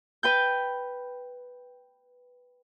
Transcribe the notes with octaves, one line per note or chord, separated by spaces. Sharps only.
B4 G5 G6